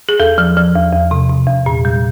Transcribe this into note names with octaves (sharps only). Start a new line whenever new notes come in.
G#4
E2 A4
F3
F3
E2
E2
C3
C3
E2
A#2
G3